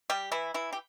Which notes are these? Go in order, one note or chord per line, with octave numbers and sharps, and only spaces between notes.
G3 G4
E3 E4
E3 E4
G4